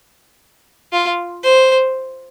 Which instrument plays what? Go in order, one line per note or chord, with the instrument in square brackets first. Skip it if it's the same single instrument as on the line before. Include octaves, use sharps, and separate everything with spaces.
[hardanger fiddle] F4
C5